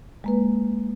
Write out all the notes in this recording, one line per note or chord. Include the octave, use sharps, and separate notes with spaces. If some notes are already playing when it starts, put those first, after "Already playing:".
G#3 A#3 B4